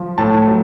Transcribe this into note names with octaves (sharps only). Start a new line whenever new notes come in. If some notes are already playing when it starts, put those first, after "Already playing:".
Already playing: F3
A2 A5
F#3